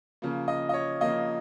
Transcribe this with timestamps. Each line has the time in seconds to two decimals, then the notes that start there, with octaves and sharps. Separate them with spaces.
0.22 C#3 F3 A#3
0.48 D#5
0.69 D#5
0.74 C#5
1.01 C#3 F3 A#3 D#5